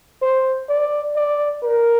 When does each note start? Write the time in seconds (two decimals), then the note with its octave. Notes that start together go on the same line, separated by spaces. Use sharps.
0.22 C5
0.69 D5
1.16 D5
1.63 A#4